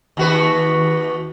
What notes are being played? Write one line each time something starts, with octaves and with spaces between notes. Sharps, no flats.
D#2 F#4 B4